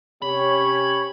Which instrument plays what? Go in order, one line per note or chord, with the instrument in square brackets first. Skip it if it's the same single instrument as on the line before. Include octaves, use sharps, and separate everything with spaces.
[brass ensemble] C3 C#4 G4 [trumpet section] C#5 [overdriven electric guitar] B5